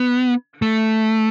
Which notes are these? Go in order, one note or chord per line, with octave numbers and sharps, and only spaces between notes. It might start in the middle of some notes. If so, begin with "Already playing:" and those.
Already playing: B3
A3